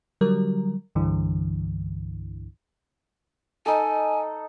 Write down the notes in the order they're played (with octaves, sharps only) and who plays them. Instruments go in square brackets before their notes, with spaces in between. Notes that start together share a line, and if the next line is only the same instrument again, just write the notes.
[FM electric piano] D3 F#3 G3 A#4
C2 G2 D3 E3
[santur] D#4 A4 [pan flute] G#5